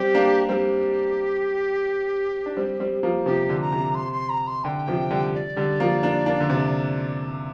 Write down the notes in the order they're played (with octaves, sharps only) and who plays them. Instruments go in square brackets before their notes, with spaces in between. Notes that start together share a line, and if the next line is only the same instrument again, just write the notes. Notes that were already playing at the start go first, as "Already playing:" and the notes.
Already playing: [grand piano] G3 C4 [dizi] G4
[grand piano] A#3 D4
[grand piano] G3 C4 [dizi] A#4
[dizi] G4
[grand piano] D4
G3 C4
G3 C4
F3 A#3
[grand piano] C3 F3 [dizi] G4
[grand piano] D3
[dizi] A#5
[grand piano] C3
[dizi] C6
C6
A#5
C6
[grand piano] D3 [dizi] G5
[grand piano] C3 F3
D3 G3
[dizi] D5
[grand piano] D3 G3
F3 A#3
A#3 D4
A#3 D4
D3
C3